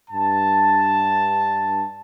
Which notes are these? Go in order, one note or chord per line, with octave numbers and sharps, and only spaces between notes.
G2 A5